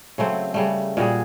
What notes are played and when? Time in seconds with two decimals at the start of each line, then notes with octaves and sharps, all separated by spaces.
0.18 C#3 F#3 A3 C4
0.54 C#3 G3 A3
0.97 A#2 G3 F#4 G#4